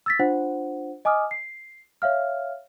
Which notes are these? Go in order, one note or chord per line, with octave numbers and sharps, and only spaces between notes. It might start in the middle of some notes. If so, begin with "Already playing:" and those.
E6 A6 B6
D4 F4 C5 F#5
D#5 G#5 D6 D#6 F6
C7
C#5 E5 F5 F6